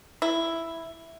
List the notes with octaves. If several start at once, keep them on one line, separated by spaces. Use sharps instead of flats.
E4